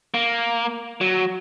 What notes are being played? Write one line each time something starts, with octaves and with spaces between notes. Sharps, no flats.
A#3
F#3